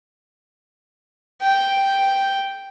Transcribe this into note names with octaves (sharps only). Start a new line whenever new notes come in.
G5